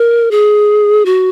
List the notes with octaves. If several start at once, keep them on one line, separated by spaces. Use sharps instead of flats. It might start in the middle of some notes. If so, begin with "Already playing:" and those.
Already playing: A#4
G#4
F#4